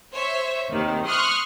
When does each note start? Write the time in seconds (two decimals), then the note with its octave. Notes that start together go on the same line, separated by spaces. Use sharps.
0.13 C5 C#5 E5
0.71 D#2 C3 D#3
1.07 C6 C#6 D#6 F6 F#6